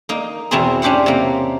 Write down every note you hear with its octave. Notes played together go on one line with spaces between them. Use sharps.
A#3 D#4
E2 B2 B3 C4 F#4 G#4
C#4 D4 G4 C5 F#5
C3 A#3